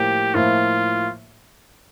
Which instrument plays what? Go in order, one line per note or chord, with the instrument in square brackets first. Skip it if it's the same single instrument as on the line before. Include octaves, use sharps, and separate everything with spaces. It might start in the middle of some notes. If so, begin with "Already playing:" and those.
Already playing: [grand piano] A2 F3 A#3 [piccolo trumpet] G4
[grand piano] A2 F3 A#3 E4 [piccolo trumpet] F4